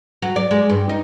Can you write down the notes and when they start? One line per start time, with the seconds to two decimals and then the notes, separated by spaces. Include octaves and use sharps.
0.22 F#3
0.36 D5
0.51 G#3
0.70 G2
0.89 D#4